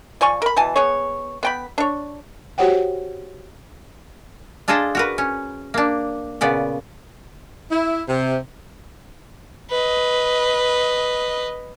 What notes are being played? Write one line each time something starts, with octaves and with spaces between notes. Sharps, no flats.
F3 D5 G#5 C#6
A#4 B5
B2 E3 G#5 A5
B3 G#4 C#5
B3 G5 B5
D4 C#5
F#4 G4 C5 C#5 F#5 G5
D4 F4 G#4 A4 D#5 A5
F#4 A#4 B4
C#4
A#3 D4
A#2 C#3 B3 D5
E4
C3
B4 D#5